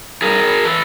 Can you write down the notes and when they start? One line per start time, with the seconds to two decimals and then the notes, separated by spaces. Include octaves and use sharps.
0.22 G2 G#4 A#4
0.65 E3 A4 B4